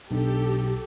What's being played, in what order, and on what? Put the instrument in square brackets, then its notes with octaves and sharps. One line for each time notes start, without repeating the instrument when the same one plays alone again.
[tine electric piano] B1 [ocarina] D4 [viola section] G4 A4